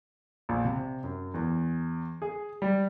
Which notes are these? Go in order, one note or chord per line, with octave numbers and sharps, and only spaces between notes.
A#1
C3
F#2
E2
G#4
G3